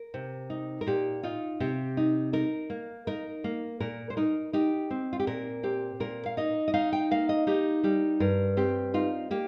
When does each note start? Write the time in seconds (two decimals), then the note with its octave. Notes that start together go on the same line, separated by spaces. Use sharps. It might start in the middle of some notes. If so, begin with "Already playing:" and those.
Already playing: A#4
0.14 C3
0.50 D#4
0.81 A#4
0.87 A#2 G4
1.23 D#4 F4
1.60 C3 G4
1.97 D#4
2.33 D#4 A#4
2.70 A#3
3.07 D#4 A#4
3.44 A#3
3.80 A#2 A#4
4.10 C5
4.17 D#4 A#4
4.53 D#4 G4
4.90 C4
5.13 F4
5.20 G4
5.27 A#2 A#4
5.63 C4 G4
6.00 A#2 A#4
6.26 F5
6.37 D#4 D#5
6.68 D#5
6.74 D#4 F5
6.93 G5
7.11 A#3 F5
7.29 D#5
7.47 D#4 G4
7.84 G3 G4
8.20 G2 A#4
8.57 C4 G4
8.94 D#4 F4
9.31 A#3 G4